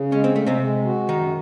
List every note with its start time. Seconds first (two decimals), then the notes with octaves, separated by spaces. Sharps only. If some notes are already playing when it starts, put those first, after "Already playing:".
Already playing: C#3
0.12 G#3 C#4
0.24 C4
0.36 G#3 A3
0.47 C3 C4
0.61 G#3
0.85 F#4
1.09 F#2 D#3 D#4